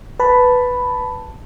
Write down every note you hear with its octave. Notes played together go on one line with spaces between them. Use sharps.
B4 A5 B5